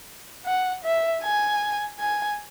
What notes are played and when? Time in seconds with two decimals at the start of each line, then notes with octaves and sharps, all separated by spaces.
0.46 F#5
0.84 E5
1.22 G#5
1.99 G#5